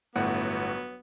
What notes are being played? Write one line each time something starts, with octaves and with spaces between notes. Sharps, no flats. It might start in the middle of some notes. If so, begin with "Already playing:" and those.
G1 A2 F#3 B3 F#5